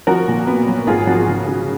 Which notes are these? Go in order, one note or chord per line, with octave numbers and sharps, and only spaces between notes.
F3 F#4 A#4
A#2
B3
F#3
G#1 F4 G#4
F3 F#4
C#3
C#3